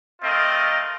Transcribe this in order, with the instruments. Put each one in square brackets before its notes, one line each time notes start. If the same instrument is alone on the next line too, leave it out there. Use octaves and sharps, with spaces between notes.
[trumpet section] A3 C4 F4 A#4 D#5